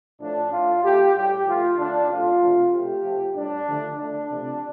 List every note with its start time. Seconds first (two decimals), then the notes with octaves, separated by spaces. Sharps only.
0.20 A2 F3 A3 D4
0.51 A2 A3 F4
0.83 C3 A3 G4
1.14 A2 G3 G4
1.46 C3 F3 A3 F4
1.78 D3 A3 D4
2.09 C3 F3 A3 F4
2.41 C3 F3 A3
2.72 C3 A3 G4
3.04 C3 F3 A3
3.35 A2 G3 D4
3.67 D3 F3 A3
3.98 D3 A3 D4
4.30 C3 F3 A3